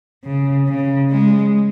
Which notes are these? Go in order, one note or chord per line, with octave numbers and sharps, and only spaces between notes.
C#3
C#3
G#3